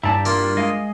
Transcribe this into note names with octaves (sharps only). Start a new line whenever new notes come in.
G2 E4 D5 E5 A5 A#5
A#3 F4
G#3 G#4 D#5 F5